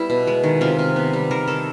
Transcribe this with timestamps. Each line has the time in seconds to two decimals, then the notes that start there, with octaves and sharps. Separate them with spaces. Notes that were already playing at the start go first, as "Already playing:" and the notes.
Already playing: G3 B3 E4
0.10 B2
0.27 G#3
0.44 D#3
0.61 C3 F4
0.79 C3
0.96 B3
1.13 G3
1.31 D#3 A#4
1.48 D#3 A4